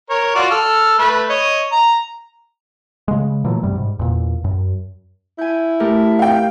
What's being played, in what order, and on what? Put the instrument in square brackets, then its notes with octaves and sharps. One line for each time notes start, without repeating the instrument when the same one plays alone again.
[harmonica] A#4 C#5
F4 F#4 D5
A4 E6 F6
A3 B4
C#5 D#5
A#5
[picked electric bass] C#3 G#3
A#2 E3 F#3 A3
F#2 C3 G3
G#2
E2 A#2
F#2
[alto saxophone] E4 [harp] G#5 G6
[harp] A3 G4 A#4
[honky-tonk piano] F5 G5